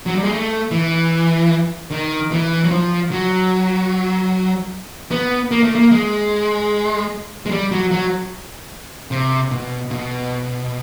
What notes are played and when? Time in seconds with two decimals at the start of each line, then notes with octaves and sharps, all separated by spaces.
0.06 F#3
0.16 G3
0.23 G#3
0.32 A3
0.71 E3
1.91 D#3
2.32 E3
2.64 F#3
2.71 F3
3.11 F#3
5.11 B3
5.51 A#3
5.64 A3
5.75 A#3
5.91 G#3
7.46 G#3
7.51 G3
7.71 F#3
7.91 F#3
9.11 C3
9.51 B2
9.91 B2